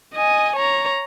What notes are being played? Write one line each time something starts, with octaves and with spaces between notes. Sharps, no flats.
D#5 G#5
C#5 A#5